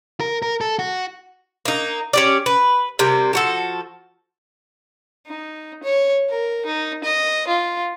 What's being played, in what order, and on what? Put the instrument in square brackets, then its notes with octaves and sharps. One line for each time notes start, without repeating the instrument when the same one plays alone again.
[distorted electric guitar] A#4
A#4
A4
F#4
[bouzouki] A#3 D#4
C#4 G4 D5
B4
C3 G3 A#3
F3 F#4 A4
[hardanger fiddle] D#4
C#5
A#4
D#4
D#5
F4